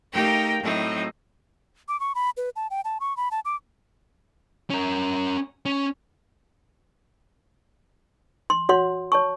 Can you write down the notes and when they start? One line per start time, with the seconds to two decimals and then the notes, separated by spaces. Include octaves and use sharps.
0.12 A3 D#4 G4 A#4 F5 G5
0.61 A2 F#3 C4 D#4
1.88 D6
2.00 C#6
2.15 B5
2.37 B4
2.56 A5
2.70 G5
2.85 A5
3.00 C#6
3.17 B5
3.31 A5
3.45 D6
4.70 C#4 A#4
5.66 C#4
8.50 C6
8.69 F#4 C#5 F#5 C6
9.12 C#5 A5 C#6